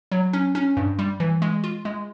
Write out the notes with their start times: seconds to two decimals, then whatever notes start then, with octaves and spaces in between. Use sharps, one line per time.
0.11 F#3
0.33 C#4
0.55 C#4
0.77 G2
0.99 G3
1.20 E3
1.42 G#3
1.64 F4
1.85 G#3